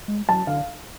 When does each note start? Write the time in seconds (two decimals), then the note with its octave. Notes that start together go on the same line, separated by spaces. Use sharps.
0.08 G#3
0.28 F#3 A5
0.47 D3 F5